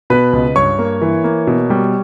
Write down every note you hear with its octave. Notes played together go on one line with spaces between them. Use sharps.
B2 B4 B5
C#2
G2 C#5 C#6
A#3
E3
A#3
B2
G3